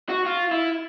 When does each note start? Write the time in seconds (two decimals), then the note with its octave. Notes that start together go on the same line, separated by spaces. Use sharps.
0.09 F#4
0.26 F4
0.51 E4